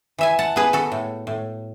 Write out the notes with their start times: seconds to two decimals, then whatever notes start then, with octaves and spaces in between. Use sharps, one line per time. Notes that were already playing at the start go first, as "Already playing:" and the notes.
0.19 E3 E5 G#5
0.39 F#5 A5
0.56 B3 G#4 B4
0.73 F#4 A4
0.92 A2
1.27 A2